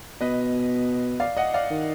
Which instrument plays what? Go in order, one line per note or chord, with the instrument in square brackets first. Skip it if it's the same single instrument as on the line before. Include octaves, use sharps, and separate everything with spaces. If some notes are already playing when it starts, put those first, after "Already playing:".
[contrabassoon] B2 [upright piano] B4 D#5
[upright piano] D5 F5
D#5 F#5
D5 F5
[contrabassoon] D#3